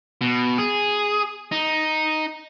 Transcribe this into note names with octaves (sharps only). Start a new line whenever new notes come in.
B2
G#4
D#4